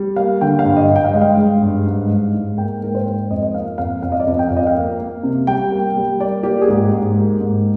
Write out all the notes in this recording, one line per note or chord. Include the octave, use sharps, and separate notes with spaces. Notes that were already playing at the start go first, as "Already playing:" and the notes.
Already playing: G3
A#3 F5
D3 G5
F5
G2
D#5
G2
G5
F5
G#3 D#5
F5
G#3
G2
G#2
G#2
G#2
A#3 G5
G#2 A#4
C5
G#2
F2 D#5
D#5
A#3 F5
F2 F5
F2 F5
D#5
D5
F2 D#5
G5
F2 F5
D#5
F5
A#3
A#3
C3
G3 G5
A#3
G3
A#3 D5
A#3 G4
G#4
G#2 G4
G#2
A#3
G#2